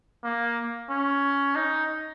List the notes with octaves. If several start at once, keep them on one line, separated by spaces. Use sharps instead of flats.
A#3
C#4
D#4